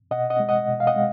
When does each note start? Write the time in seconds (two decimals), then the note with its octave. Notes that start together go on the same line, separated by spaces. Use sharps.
0.11 B2 D#5 F#5
0.30 D#5 F#5
0.40 G#3
0.49 D#5 F#5
0.68 B2
0.80 F5
0.87 D#5 F#5
0.96 G#3